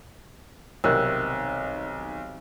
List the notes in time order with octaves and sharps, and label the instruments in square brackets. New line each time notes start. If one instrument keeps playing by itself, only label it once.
[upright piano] B1 [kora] C3 D#3 G3 [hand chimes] E6 F#6